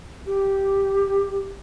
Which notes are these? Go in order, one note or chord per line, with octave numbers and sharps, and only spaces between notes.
G4